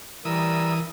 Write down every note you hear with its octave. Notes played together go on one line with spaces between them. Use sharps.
E3 G3 A#4 D#6 E6